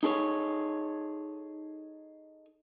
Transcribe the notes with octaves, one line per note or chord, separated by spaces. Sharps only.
D#4 G#4 A4 C#5